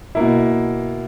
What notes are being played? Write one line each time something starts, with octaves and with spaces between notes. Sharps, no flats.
B2 A#3 E4